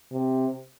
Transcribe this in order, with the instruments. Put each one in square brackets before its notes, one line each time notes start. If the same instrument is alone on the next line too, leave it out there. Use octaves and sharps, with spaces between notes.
[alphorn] C3